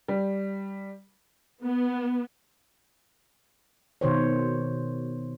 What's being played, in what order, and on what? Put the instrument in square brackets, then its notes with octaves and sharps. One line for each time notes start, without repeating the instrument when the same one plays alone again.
[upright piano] G3
[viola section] B3
[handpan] B2 D#3 C5 C#5